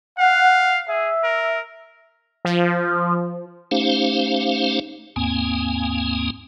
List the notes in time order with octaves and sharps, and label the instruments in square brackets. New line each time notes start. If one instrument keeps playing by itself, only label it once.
[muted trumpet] F5 [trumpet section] F#5
[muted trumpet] G#4 [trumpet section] E5
[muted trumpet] A#4
[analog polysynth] F3
[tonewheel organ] A3 C#4 D#4 G4 C5 F5
D#2 G#2 A#3 C4 G#5